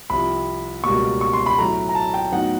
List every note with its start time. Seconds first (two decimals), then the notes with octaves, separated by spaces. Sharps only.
0.10 C2 C3 F3 B5
0.84 C#2 B2 G3 A#3 C#6
1.21 C#6
1.33 C6
1.46 B5
1.58 A2 F#3 A3 A#5
1.89 A#5
1.95 A5
2.14 G5
2.32 A2 F#3 B3 D#4 F#5